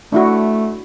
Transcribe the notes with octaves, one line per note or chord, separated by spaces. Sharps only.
A3 D4 E4 F#4